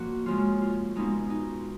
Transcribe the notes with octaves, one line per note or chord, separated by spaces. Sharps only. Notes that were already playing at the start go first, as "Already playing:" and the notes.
Already playing: A#2 F3 A#3 F#4
C#3 F3 G#3 F4
F4
B2 G#3 D#4
D#4